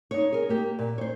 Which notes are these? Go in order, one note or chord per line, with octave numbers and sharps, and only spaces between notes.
D#4 C#5
G#4 A#4
A#3 G4
A#2
C5 C#5